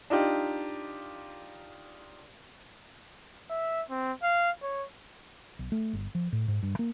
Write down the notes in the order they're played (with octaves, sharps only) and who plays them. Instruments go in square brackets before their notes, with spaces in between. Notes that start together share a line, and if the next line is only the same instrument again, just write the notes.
[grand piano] D4 D#4 F4 G4
[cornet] E5
C4
F5
C#5
[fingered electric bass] B1
A3
G1
F3
A2
G#2
G2
A#3